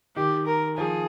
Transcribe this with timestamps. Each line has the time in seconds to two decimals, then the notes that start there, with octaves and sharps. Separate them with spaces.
0.16 D#3 G4
0.46 A#4
0.77 F3 G#4